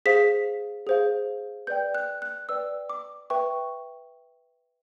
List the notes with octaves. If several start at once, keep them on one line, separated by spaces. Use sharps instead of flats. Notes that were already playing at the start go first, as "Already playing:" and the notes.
G#4 C5 F5 B6
G#4 C5 F5
B4 D5 G5 G6
F#6
F#6
B4 D5 G5 E6
D6
B4 E5 G5 C#6